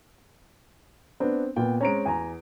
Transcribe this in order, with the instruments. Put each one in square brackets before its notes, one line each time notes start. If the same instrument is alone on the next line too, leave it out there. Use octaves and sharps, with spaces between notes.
[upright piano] B3 D4 [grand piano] C4
[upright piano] A#2 B3 [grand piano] G5
[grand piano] G#3 C4 C#4 [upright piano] C#5 A#5 D7
[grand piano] E2 [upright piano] G#5 A#5